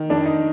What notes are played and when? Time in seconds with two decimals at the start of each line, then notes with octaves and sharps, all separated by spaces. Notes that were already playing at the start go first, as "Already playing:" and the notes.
Already playing: D#3
0.10 F2 D4
0.26 D#4